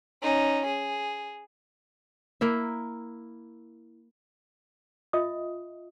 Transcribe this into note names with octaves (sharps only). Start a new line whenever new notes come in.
C#4 D#4
G#4
A#3 E4 E5
F4 D#5 E5 D#6